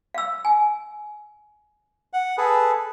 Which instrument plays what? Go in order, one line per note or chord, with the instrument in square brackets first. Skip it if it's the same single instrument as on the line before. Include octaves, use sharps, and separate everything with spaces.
[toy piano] F5 E6
G#5
[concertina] F#5
G#4 A4 B4